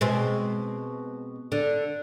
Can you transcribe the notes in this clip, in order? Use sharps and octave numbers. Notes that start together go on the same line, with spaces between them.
B2 G#3 C4
D3